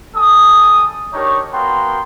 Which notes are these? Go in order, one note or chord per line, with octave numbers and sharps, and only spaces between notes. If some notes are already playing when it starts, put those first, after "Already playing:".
G3 A4 G#5 D#6
D4 D#4 G4 A#4 C#5
B3 F#4 A#4 F5 G5 C6